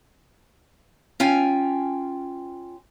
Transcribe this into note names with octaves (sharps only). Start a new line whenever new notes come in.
C#4 F4 G5 G#5